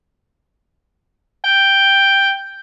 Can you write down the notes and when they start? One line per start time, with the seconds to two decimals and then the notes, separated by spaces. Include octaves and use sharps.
1.44 G5